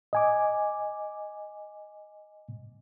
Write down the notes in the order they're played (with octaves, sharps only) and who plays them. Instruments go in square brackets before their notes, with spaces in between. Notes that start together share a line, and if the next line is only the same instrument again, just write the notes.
[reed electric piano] D#5 G#5 D6